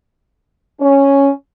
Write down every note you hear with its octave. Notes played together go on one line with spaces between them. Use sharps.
C#4